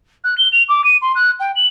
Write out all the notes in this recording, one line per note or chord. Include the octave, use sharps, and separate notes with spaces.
F#6
G7
F7
D6
D#7
C6
F#6
G5
F#7